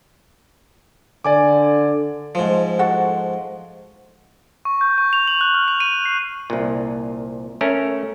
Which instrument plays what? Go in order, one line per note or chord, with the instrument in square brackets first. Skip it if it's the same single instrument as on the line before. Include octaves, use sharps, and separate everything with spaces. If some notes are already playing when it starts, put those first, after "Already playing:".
[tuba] D3 [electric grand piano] D5 G#5 D6
[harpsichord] G#2 F3
[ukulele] F#4 A4 F#5
[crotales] C#6
G6
C#6
F7
F#7
F#6
F6
F7
D#7
C7
[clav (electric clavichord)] C2 A#2
A3 C#4 A#4